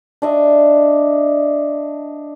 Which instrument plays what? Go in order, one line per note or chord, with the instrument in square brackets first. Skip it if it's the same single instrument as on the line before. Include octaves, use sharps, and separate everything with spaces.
[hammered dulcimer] D4 D#5 E5